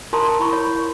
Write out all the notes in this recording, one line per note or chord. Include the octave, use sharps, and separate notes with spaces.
F4 A#4 A5 A#5 C6 D#6
E4 B5 C#6
C#5